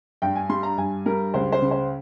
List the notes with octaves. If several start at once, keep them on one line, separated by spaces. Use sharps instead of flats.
G2 G5
G#5
G3 C6
A#5
G2 G#5
G3 A#4
C#2 C5
C5
C#3
C5